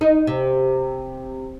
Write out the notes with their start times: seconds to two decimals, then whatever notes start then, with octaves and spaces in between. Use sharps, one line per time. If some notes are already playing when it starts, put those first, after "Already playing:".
0.01 D#4
0.27 C3